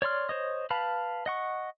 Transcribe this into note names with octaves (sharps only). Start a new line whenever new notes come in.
C#5 D5 C6 F6
C5 C#5 D#5
B4 F5 A5 B5
D#5 F#5 C#6